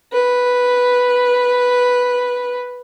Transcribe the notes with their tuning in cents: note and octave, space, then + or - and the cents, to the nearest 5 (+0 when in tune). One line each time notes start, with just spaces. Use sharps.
B4 -5